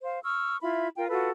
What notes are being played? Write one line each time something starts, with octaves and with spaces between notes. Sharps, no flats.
C5 F5
C#6 E6 F6
E4 F4 E5 B5
F4 A#4 G5
F4 F#4 A4 B4